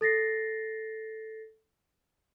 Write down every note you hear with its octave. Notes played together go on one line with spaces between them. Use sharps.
A4 A6 A#6 C7